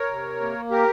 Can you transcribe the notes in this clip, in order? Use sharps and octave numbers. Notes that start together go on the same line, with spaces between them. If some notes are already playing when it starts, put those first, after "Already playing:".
Already playing: A#4 C#5
C3
A#3
G4 A#4